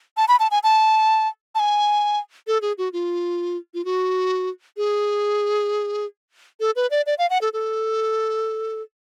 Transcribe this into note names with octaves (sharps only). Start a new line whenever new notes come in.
A5
B5
A5
G#5
A5
A5
G#5
A4
G#4
F#4
F4
F4
F#4
G#4
A4
B4
D5
D5
F5
F#5
A4
A4